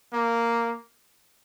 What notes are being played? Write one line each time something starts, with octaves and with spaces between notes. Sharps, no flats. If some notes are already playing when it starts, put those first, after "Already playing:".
A#3